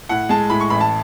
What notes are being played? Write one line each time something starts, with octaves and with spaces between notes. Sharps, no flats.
A2 F#5
G#3 A5
A2 B5
C#6
A1 B5
A5